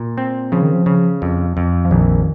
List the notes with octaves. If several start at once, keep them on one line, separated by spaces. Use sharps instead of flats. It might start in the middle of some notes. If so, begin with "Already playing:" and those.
Already playing: A#2
C4
C#3 F3
D#3
F3
C#3
F2
F2
F3
A#1 D#3